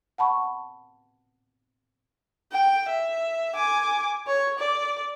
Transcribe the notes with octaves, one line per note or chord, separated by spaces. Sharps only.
F#5 A5 B5 C#6
G5
E5
G#5 D6
C#5
D5